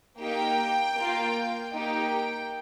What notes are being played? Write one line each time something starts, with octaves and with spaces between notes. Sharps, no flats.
A#3 D#4 G4 G5
A#3 F4
A#3 D#4 G4 G5